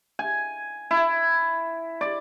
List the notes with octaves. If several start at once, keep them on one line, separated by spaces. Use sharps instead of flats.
G#5
E4
D5